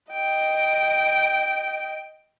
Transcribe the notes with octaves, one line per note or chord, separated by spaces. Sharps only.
D#5 G5